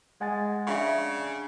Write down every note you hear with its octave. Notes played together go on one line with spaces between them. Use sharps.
G#3 F#5 G#5 A6
C#3 D4 E5 F5 C#6